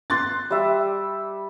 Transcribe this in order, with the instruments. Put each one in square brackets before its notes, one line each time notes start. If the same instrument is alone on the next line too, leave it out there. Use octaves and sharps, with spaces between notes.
[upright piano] C6 F#6 A6
[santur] G3 E5